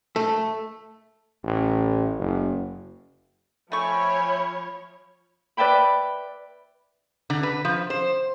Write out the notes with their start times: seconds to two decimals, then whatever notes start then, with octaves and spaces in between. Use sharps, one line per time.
0.16 A3
1.43 A1
2.18 F#1
3.72 F3 A3 C#5 E5 G5 G#5 B5 C#6
5.57 B4 D5 E5 G5 B5
7.30 D3
7.43 B4
7.65 F3
7.90 C5